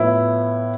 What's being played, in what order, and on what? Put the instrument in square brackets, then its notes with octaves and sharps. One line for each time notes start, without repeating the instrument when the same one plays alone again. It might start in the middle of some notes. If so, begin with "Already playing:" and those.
Already playing: [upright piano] A2 F3 B3 E4